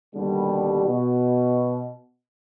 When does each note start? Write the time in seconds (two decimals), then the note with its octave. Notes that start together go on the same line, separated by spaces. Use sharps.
0.15 D#2 B2 D3 G3
0.87 B2